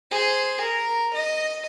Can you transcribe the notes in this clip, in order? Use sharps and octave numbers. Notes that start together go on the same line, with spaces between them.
G#4 C5
A#4
D#5